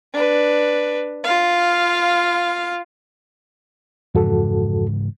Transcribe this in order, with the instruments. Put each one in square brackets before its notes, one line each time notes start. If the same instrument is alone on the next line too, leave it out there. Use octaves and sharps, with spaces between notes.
[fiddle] D4 B4
F4 F5
[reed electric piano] F2 F#4 A4 [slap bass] G#2 C#3 E3